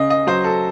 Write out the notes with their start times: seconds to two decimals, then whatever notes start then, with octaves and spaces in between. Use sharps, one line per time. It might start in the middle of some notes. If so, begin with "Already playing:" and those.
Already playing: C#3 D#5
0.10 D#5
0.27 F#3 C5
0.44 A4